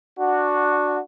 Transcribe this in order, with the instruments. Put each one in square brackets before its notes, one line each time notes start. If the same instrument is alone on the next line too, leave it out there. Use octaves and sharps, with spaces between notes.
[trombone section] D4 F#4